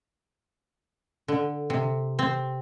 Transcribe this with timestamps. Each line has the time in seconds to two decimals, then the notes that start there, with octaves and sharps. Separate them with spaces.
1.28 D3
1.70 C3
2.19 C4